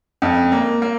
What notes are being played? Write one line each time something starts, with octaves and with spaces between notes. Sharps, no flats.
F2
A#3
A#3